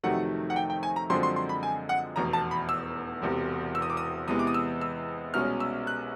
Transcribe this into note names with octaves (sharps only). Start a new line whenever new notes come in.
F2 C3 D#3 F#3 A3 F#5
F#5
G5
G5
G#5
A#5
F#2 D3 F3 G#3 C4 C6
C6
C6
B5
G#5
F#5
F1 E2 B2 A#5
A5
B5
E6
E1 E2 C3
E6
D#6
D6
D#6
E2 C3 E3 G#3 B3 D#6
D6
D#6
E6
E6
C2 B2 G#3 C#4 F6
E6
F#6